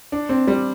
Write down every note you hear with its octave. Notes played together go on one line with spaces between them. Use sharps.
D4
C4
G3